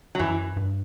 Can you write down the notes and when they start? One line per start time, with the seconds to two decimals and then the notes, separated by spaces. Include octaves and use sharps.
0.15 F#3
0.19 F#2 E3
0.57 G2